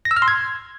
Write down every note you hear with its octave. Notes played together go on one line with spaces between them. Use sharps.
A#6
E6
F6
C6
G#6